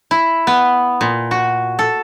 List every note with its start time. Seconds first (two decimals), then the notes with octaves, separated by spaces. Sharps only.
0.11 E4
0.47 B3
1.01 A#2
1.31 F#4
1.79 A4